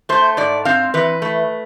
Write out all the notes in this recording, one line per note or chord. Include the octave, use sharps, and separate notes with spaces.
A3 C5
G#2 D5
C4 F5
E3 B4
A3